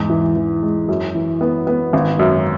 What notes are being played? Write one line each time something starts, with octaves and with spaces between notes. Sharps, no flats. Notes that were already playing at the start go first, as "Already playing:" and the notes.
Already playing: E2 G#2
E3
E3
G#3
F#2
E3
B3
B3
G#1
F#2